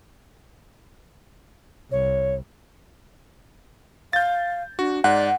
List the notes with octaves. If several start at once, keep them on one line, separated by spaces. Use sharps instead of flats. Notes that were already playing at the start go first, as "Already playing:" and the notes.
C2 C#5
F5 G6 A6
D4 F#4
G#2 D5 F#5